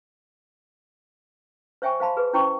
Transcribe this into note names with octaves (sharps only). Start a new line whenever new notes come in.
C5 C#5 E5 G5 G#5 C#6
C5 F5 A5 B5 C6
G#4 B4
C#4 E4 C5 G5 C6 C#6